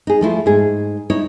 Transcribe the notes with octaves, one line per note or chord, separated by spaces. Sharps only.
D#4 G#4
F3 A3 E4 F4
G#2 G#4
D#4 E4 C#5